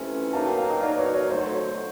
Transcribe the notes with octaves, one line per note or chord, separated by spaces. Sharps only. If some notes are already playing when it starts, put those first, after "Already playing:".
Already playing: F2 C3 E3 A3 C#4 G#5
B2 F#3 A#3 D#4 A5
G5
F5
D#5
B2 F#3 A#3 D#4 D5
C#5
C#5
F2 D3 F#3 A3 C5